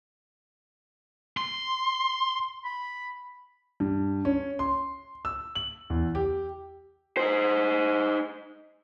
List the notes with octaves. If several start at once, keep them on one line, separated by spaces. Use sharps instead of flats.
C6
B5
G2
C#4
C6
E6
F#7
E2
G4
D#4 C5